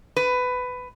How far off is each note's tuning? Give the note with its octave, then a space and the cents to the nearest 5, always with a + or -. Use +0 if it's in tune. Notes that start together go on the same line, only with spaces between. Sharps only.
B4 +15